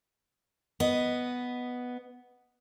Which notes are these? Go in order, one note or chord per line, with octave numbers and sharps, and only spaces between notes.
B3 D#5